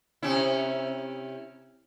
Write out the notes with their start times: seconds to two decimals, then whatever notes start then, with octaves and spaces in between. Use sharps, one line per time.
0.23 C3 C#4 E4